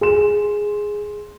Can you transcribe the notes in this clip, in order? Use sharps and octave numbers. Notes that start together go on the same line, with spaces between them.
G#4 C6 E7